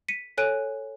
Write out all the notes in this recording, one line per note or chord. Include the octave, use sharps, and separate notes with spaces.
B6 C#7 D#7
A4 C#5 G#5 F#6 D7 D#7